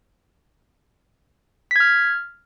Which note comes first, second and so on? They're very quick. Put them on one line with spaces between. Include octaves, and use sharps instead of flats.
B6 G#6 F6